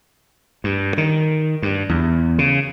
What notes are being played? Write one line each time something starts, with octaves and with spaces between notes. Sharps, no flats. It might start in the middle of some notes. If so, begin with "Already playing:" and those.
G2
D#3
G2
E2
C#3